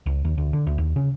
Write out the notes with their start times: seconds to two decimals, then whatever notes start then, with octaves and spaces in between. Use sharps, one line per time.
0.06 C#2
0.25 D#2
0.38 D2
0.53 D3
0.67 D2
0.78 D#2
0.96 C#3